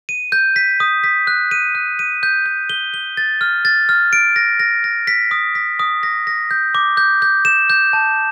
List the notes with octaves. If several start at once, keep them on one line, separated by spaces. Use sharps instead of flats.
D#7
G6
B6
D#6
B6
F#6
D#7
F#6
D#7
G6
G6
G7
G7
A6
F6
A6
F6
D7
A#6
A#6
A#6
B6
D#6
B6
D#6
A#6
A#6
G6
D6
G6
G6
E7
G6
A5